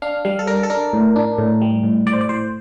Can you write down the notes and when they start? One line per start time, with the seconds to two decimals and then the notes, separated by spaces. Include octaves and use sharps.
0.02 D4 F5
0.25 G3 F5
0.39 A4
0.47 D4 A#4
0.63 A4
0.70 D4 A#4
0.93 A2
1.16 D4
1.38 A2
1.62 G3
1.83 A2
2.06 A2 D5
2.13 C5
2.21 D5
2.29 A2 C5